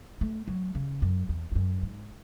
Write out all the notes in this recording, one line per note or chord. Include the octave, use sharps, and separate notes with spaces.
A3
F#3
C#3
F#2
E2
E2
F#2
G#2